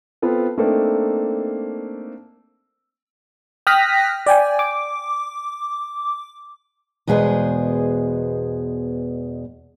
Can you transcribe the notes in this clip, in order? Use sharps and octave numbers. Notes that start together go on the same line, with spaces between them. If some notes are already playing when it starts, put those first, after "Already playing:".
B3 C4 F4 A4
A3 A#3 C4 D4 D#4 A4
G5 D#6 F6 F#6 A#6 B6
D5 G5 G#5
D6
E2 B2 G#3 G#4 B4 C5